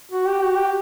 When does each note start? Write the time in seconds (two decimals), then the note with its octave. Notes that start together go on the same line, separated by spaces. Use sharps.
0.11 F#4
0.28 G4
0.44 F#4
0.56 G4